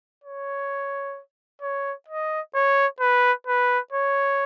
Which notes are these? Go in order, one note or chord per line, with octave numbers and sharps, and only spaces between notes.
C#5
C#5
D#5
C#5
B4
B4
C#5